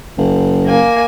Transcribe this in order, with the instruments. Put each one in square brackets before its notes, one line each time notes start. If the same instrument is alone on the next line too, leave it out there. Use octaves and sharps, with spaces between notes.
[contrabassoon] F#1
[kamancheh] A#3 G#5